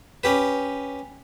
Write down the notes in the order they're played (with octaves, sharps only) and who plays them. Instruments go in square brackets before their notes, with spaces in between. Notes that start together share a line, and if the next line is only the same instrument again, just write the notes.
[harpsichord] C#4 G4 B4